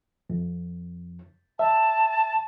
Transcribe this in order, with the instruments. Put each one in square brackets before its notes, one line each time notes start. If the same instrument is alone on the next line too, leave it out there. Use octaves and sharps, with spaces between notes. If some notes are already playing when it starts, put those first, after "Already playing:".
[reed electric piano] F2
[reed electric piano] E5 [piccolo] A5